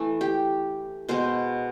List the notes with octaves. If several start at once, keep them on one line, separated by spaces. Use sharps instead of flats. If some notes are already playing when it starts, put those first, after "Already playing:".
Already playing: E3 A3
G4
B2 G#3 B3 C5